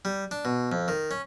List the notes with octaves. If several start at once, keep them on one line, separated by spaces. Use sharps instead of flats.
G3
D4
B2
F2
D#3
C#4